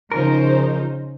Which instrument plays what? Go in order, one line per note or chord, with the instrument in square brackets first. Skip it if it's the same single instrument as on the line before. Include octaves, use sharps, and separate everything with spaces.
[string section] C#3 D#4 C5 [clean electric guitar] F3 A#4